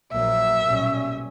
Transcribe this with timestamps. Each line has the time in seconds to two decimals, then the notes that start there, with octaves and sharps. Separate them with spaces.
0.12 A#1 A#2 F#3 A#3 E5
0.66 B1 A#2 G3 C#4